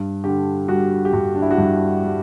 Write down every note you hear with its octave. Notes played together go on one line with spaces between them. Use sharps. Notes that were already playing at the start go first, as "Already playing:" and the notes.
Already playing: G2
D3 G4
G3 F#4
G4
G2 F#4
D4
E4
F#4
G2 G4
G3